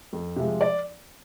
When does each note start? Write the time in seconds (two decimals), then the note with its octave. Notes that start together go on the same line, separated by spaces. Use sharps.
0.13 F2
0.36 C3 F3 G#3
0.61 D5